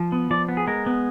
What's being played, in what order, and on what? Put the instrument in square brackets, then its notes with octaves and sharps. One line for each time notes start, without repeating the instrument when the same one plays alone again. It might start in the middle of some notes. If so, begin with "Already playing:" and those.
Already playing: [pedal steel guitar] F3
B3
F3 D5
B3
G#4
G#3 A#4
B3